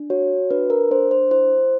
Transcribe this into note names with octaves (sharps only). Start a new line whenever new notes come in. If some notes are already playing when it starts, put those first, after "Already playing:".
Already playing: D4
F#4 C#5
D4 B4
A#4
D4 C5
C5
E4 C5